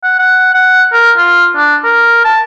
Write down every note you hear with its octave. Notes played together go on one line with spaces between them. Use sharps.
F#5
F#5
F#5
A#4
F4
D4
A#4
A5